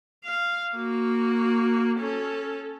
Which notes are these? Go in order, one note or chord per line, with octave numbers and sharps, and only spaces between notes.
F5
A#3 F#4
C#4 A4